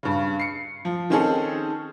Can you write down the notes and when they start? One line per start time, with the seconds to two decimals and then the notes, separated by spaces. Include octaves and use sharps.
0.03 G2 C#3
0.40 C7 C#7
0.85 F3
1.10 D#3 C4 C#4 D#4 G#4 A4